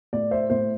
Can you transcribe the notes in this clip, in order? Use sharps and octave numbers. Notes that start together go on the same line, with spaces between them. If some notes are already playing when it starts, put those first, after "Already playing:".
A2 D5
C5 E5
A2 C5